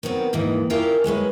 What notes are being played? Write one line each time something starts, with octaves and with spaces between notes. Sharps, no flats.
D#3 F#3 B3 C4
D#2 G#2 D#3 E3
C#4 E4 F4 G4 A#4
F#3 G#3 C#4 B4